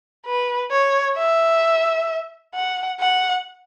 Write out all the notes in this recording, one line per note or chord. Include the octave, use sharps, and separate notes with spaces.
B4
C#5
E5
F#5
F#5